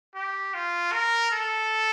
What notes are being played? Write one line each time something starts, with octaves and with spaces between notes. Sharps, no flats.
G4
F4
A#4
A4